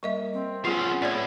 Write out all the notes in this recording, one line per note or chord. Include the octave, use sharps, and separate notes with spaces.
G3 A#3 D#5 E5
C4
F3 B3 C#4 F4 G#4
A2 G#4 C#5 D5